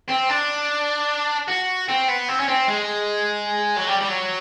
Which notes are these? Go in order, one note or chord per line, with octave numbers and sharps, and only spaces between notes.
C4
D4
F#4
C4
B3
C4
C#4
C4
G#3
F#3
G3
G3
F#3